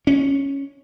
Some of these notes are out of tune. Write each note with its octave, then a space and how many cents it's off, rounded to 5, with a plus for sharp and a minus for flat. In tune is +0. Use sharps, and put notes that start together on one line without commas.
C#4 -5